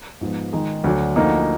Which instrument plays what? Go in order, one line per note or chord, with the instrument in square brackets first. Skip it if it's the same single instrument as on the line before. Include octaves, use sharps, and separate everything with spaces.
[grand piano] G#2 F3 B3
D#3 G#3 D#4 G#4
D2 D3 F#3 D4
D2 D3 F3 A#3 D#4